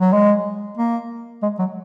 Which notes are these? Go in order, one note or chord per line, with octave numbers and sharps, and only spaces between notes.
F#3
G#3
A#3
G#3
F#3